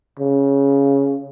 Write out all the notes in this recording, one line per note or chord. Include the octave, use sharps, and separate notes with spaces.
C#3